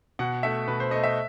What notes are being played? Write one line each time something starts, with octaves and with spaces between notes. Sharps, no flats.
B2 F#5
A3 E5
B2 B4
C5
A3 D#5
E5